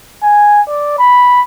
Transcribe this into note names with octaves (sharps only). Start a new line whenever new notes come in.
G#5
D5
B5